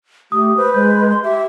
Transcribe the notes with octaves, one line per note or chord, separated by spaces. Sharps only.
A3 G4 D#6
B4 C5
G#3 G6
C6
G4 E5